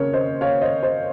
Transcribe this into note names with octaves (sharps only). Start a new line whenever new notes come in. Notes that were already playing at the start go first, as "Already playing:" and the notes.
Already playing: C#3 C4 A#4 C#5
C5 D#5
C#5 F5
C5 D#5
C5 D#5